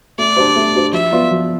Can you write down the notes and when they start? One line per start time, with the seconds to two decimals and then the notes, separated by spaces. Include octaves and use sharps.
0.18 A3 D5
0.37 D4 G4 C5
0.56 A3
0.75 D4 G4 C5
0.93 F3 E5
1.12 B3 F4 B4 D5
1.31 F3